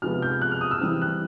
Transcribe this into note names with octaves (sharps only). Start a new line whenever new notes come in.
C3 F3 G#3 B3 F6
G6
F#6
F6
D#6
E6
E3 G3 C4 F6
F#6